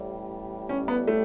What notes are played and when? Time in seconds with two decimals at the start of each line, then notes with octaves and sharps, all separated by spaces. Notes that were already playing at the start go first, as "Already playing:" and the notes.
Already playing: A1 A2 G3
0.69 C#4
0.88 B3
1.08 A3